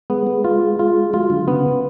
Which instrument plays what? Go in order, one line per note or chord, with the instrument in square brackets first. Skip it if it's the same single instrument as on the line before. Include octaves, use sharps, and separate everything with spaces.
[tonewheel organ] G#3 [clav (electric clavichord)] B3
[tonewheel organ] G#3
[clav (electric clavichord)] F4
F4
[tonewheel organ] F#3 [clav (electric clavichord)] F4
[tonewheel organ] D3
[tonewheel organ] C#3 [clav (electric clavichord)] B3